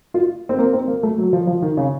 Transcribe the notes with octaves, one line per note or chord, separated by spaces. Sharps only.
F4
C4
A#3
C4
A#3
A3
F#3
F3
F3
D#3
C#3